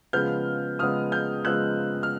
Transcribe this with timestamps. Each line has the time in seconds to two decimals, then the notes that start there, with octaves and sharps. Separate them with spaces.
0.13 C#3 F3 G#3 B3 F6 G6
0.79 C#3 F3 G#3 B3 D#6 F6
1.12 F6 G6
1.45 C#3 F3 G#3 B3 E6 F#6
2.03 F6